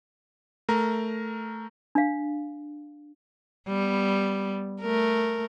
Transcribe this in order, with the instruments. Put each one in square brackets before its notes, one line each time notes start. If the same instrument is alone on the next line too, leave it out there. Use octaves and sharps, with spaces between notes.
[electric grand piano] A3 A#4 A#5
[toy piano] D4 F5
[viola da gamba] G3 B3
A3 A#4